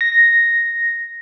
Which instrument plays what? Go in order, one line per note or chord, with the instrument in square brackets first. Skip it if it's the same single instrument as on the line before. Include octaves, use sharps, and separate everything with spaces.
[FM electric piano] A#6